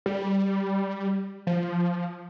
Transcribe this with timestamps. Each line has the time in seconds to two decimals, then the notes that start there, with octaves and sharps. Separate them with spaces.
0.06 G3
1.47 F3